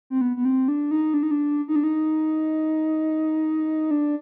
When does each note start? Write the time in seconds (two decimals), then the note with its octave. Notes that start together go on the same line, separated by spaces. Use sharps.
0.10 C4
0.21 B3
0.36 B3
0.45 C4
0.68 D4
0.91 D#4
1.14 D4
1.23 D#4
1.31 D4
1.68 D#4
1.76 D4
1.84 D#4
3.91 D4